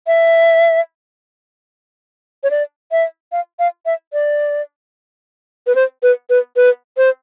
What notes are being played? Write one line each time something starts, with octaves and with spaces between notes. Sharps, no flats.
E5
C#5
D5
E5
F5
F5
E5
D5
B4
C5
B4
B4
B4
C5